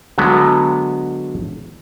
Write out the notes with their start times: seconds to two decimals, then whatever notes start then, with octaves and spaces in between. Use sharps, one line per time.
0.18 D3 F#3 G#3 B3